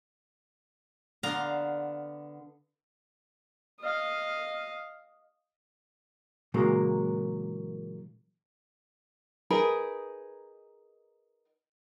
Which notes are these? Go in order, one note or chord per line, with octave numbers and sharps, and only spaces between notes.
D3 B3 F5 A#5 C6
D#5 F5
A#2 C#3 E3 F#3 G#3 A#3
D#4 G#4 A#4 B4